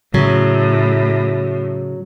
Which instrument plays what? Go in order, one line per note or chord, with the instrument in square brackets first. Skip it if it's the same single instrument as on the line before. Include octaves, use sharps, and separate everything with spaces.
[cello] A2 [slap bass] C#3 [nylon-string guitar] F#3